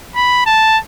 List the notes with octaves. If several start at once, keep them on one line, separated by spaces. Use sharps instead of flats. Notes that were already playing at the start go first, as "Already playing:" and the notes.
B5
A5